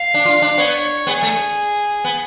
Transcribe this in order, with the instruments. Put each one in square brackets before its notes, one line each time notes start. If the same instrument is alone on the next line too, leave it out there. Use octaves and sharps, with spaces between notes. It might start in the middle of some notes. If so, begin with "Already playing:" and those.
Already playing: [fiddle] F5
[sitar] D4
F4
D4
[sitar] B3 [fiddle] C#5
[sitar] B3 [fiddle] G#4
[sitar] A3
B3